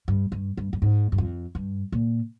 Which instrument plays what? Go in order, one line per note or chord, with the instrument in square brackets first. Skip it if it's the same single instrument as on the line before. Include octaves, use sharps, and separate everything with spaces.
[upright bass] G2
G2
G2
G2
G#2
G2
F2
G2
A#2